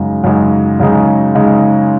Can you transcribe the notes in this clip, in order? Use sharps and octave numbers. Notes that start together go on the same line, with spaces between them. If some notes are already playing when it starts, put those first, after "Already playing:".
Already playing: F#2 C#3 G#3 D#4
F#2 C#3 G#3 D#4
F#2 C#3 G#3 D#4
C#3 G#3 D#4